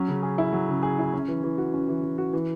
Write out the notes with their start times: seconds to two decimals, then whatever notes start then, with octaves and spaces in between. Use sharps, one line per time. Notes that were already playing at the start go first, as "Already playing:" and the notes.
Already playing: F#3 C#4
0.08 C#3
0.23 G#4
0.38 E4
0.53 F#3
0.68 C#3
0.83 G#4
0.99 E4
1.14 C#4
1.28 E3
1.43 E3
1.58 F#4
1.74 C#4
1.88 E3
2.03 E3
2.18 F#4
2.33 E3